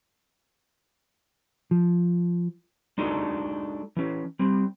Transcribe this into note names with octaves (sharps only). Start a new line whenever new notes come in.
F3
G#3 D4 D#4 F#4 A4
E3 C#4
G3 C4